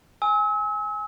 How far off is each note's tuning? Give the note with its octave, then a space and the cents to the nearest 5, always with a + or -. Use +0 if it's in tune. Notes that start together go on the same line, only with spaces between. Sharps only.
G#5 +0 E6 -40